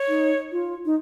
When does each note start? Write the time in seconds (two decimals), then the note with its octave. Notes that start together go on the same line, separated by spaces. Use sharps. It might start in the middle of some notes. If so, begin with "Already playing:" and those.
Already playing: C#5
0.08 D#4
0.52 F4
0.86 D#4